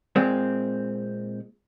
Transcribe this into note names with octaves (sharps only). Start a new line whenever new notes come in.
A#2 G#3 C4